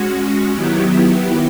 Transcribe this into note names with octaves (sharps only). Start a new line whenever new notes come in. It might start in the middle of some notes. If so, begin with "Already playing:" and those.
Already playing: G#3 C#4 F#4
D#3 F#3 B3 E4 G4